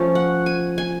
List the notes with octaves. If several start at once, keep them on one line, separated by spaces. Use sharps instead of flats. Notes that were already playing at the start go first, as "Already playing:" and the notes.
Already playing: F3 A3 C#4
F#5
G#5
G#5